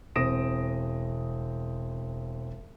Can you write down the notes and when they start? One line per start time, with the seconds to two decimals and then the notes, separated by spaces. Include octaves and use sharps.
0.16 E1 C4 D#6 A#6 D7 E7